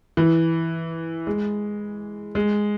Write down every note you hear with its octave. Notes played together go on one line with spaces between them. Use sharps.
E3
G#3
G#3